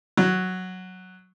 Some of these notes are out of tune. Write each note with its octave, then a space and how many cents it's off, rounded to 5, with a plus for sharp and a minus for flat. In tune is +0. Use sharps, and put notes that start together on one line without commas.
F#3 +0